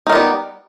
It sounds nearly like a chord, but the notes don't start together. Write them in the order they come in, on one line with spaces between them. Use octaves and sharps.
D#4 A#4 B3 G3